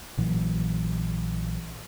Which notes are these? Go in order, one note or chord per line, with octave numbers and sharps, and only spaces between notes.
A#1 A#2 E3 F#3